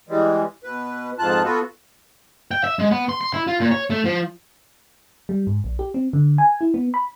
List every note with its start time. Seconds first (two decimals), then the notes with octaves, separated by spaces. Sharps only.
0.09 E3 G3 G#3
0.64 B2 B4
1.19 F2 G#2 F4 A5 F#6
1.44 B3 F4 F#4 A4 B4
2.51 G5
2.64 E5
2.79 G#3
2.91 B3
3.09 C6
3.21 C6
3.34 E4
3.47 F4
3.60 A#2
3.71 C#5
3.90 A3
4.05 F3
5.29 G3
5.47 G#2
5.64 A#1
5.79 G4
5.94 C4
6.13 D3
6.38 G#5
6.61 E4
6.74 B3
6.94 B5